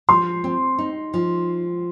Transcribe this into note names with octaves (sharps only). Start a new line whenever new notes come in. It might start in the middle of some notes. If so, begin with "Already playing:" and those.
F3 C6
C4
D#4
F3